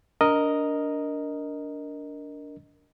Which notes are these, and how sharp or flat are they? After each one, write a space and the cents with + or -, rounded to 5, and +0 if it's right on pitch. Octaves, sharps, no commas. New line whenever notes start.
D4 -25 A#4 +0 D#5 +0